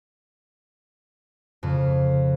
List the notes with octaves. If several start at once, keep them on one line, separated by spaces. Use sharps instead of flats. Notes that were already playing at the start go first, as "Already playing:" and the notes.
F2 C#3